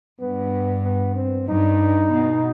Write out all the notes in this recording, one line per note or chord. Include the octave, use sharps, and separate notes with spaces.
G2 B3
B3
C4
G2 D#4
B2